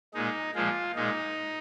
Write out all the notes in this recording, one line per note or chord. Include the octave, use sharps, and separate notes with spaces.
A#2 G#3 D#4
A#2 F3 G#3 F4
A#2 G#3 D#4